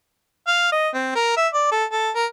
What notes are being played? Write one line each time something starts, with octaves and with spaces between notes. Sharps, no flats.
F5
D#5
C4
A#4
E5
D5
A4
A4
A#4